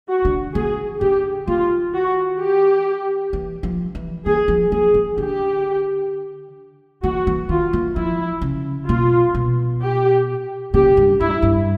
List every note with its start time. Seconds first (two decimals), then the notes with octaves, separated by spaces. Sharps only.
0.09 F#4
0.25 D3
0.55 D#3 G#4
1.01 D3 G4
1.47 D#3 F4
1.94 F#4
2.40 G4
3.33 E3
3.63 F3
3.95 E3
4.26 E3 G#4
4.48 F3
4.72 F3 G#4
4.94 D#3
5.18 D3 G4
7.03 E3 F#4
7.27 E3
7.49 D#3 F4
7.73 E3
7.96 F3 E4
8.41 C#3
8.88 B2 F4
9.35 B2
9.81 G4
10.74 C#3 G4
10.97 G2
11.20 G2 E4
11.42 G2